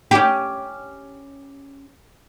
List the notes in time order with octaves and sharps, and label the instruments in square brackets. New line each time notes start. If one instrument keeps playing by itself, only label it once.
[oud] C#4 G4